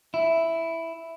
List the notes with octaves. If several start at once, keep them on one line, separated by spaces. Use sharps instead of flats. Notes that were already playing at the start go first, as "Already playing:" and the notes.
E4